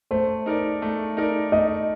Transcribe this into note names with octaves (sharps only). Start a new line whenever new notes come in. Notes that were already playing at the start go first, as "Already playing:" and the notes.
A3 C5
D#4 A#4 D5
A3
D#4 A#4 D5
A3 D#5